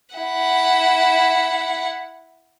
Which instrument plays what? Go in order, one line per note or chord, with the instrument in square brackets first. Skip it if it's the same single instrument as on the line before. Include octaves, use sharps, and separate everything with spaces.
[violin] E4 F#5